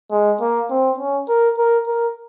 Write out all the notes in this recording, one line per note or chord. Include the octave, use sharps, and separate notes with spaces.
G#3
A#3
C4
C#4
A#4
A#4
A#4